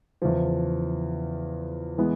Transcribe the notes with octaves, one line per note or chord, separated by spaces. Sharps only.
E2 C#3 F3
E3 G#3 B3 E4